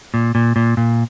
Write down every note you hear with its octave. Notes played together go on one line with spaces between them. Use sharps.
A#2
A#2
A#2
A#2